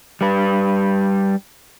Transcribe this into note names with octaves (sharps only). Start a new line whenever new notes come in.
G3 B4